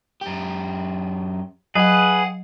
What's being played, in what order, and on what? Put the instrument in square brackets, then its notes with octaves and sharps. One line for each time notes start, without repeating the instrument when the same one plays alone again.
[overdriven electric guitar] F#2 G4
[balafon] F#3 [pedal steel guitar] G#4 B4 [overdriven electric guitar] F5 F#5